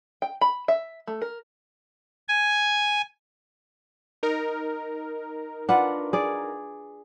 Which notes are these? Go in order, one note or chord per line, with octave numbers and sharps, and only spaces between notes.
G5
B5
E5
A3
A#4
G#5
D#4 A#4
D4 F4 B4 F#5
G#4 D5